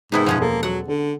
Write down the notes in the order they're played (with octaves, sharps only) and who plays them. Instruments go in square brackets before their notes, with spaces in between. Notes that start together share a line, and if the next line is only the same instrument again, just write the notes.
[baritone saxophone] G#2 [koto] C3 B3 E4 [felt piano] D#4 A#4
[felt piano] B1 F#2 F#5 [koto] F3 G#3 C#4
[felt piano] E1 A4 [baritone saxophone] A#3
[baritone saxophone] F#3 [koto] F#5
[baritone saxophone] D3 [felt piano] A4